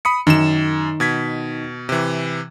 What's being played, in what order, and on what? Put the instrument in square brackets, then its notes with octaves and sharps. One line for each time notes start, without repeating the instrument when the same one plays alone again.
[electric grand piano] B5 D#6 C#7
[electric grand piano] F#2 E7 [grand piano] D#3
[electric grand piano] B2 G#6 B6
C3 E3